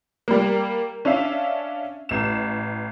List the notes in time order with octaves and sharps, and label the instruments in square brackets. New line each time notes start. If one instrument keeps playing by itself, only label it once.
[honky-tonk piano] G3 A#3
C#4 D4 E5 F5
A1 E7